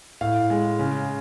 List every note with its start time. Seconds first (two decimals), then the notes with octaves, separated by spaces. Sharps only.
0.21 A2 F5
0.50 G#3
0.79 C#3